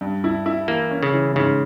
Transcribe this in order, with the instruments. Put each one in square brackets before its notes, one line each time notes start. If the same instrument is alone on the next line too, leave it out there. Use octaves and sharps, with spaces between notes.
[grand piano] G2
E4
E4
[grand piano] E3 [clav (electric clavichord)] A#3
[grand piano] C#4
[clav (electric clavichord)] C#3
[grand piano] E3
[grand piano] G#2 [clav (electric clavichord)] C#3